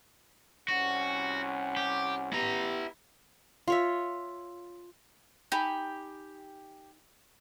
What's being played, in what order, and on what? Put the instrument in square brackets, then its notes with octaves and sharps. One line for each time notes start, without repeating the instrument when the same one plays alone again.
[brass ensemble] C2 C#4 F#5 [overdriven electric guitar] F#4
[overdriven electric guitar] G4
[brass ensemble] B3 G4 [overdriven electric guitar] E4 A#5
[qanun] F4 C#5 E5
[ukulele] D#4 G#5 B5 [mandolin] G4